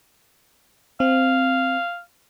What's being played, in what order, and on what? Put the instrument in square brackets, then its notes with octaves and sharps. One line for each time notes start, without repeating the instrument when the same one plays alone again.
[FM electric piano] C4 [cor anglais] F5